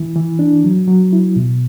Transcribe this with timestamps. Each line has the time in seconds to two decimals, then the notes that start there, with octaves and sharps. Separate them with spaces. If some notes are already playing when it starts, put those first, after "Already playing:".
Already playing: E3 E4
0.16 E3
0.39 D4
0.64 F#3
0.88 F#3
1.13 E4
1.36 B2